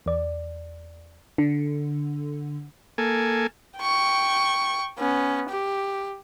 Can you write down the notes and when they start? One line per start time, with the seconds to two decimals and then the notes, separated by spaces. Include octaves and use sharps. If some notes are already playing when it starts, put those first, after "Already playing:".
0.06 E2 D5
1.38 D3
2.98 A#3 A4 G#5
3.79 G5 C#6
4.98 B3 C#4
5.49 G4